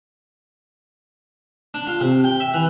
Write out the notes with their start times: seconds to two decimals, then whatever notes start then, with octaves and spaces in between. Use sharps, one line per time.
1.74 D4
1.87 F4
2.01 C3
2.24 G5
2.40 E5
2.54 E3